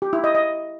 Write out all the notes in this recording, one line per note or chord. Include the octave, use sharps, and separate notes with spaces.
G4
E4
D#5
D#5